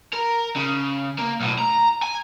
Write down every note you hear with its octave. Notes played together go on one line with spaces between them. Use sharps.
A#4
C#3
A#3
B1 A2
A#5
G#5